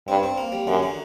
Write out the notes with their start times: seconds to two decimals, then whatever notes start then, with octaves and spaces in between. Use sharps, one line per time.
0.08 G2 C4
0.23 C4
0.38 A#3
0.52 G3
0.67 F#2 D3
0.83 D3